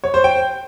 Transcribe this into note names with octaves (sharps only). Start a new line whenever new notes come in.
C#5
C5
G5